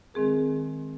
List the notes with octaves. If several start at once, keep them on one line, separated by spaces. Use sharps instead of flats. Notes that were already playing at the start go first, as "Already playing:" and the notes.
D#3 G#3 C4 G#4 A#4